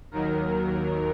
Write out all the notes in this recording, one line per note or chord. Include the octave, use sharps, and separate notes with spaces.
D#2 D#3 F#3 A#4